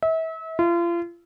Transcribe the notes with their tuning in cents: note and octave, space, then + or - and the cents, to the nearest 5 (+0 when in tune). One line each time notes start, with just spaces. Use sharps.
E5 -35
F4 -35